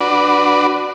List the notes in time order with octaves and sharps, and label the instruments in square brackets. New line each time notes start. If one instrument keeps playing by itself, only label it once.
[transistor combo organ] D4 F#4 B4 D5